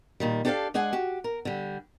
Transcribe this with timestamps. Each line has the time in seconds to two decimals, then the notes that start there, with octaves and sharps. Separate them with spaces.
0.20 A#2 D#3 G3
0.45 D4 G4 A4 B4 D5 F5
0.74 G#3 D4 G#4 F#5 G#5
0.93 F#4 G4
1.24 A#4
1.45 D3 G3